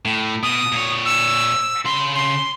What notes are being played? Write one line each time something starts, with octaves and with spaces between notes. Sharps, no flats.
A2
B2 D#6
A#2 C#5
E6
C#3 B5 C6
C6